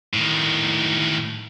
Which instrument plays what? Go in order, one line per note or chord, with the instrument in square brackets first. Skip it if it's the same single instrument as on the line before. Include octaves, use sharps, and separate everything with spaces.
[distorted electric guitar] A2 D#3